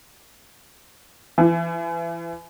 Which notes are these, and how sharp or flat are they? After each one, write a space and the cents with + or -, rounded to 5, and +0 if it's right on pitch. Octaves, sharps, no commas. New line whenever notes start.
E3 +35